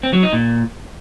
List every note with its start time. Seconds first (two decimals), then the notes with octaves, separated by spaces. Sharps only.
0.03 C4
0.13 F#3
0.23 D#4
0.33 A#2